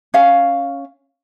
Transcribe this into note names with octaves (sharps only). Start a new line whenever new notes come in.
C#4 F5